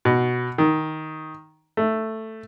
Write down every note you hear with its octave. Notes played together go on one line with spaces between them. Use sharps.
B2
D#3
A3